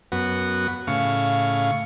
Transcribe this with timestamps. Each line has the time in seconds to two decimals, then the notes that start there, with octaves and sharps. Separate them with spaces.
0.12 F#2 B3 F#4
0.87 A2 C#3 F5 C#6